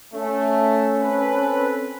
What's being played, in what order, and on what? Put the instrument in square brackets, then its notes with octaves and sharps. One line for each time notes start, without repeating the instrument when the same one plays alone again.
[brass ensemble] A3 [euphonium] C#4
[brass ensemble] C4 A4 B4